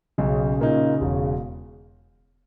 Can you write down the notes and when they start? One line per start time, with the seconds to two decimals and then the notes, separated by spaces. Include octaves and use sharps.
0.18 B1 C#3
0.60 A#2 A#3 D#4
1.01 E1